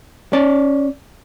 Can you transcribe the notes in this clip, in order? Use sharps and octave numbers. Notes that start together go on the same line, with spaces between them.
C#4 D5